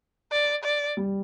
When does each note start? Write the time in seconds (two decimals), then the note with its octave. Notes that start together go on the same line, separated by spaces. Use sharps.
0.32 D5
0.64 D5
0.97 G3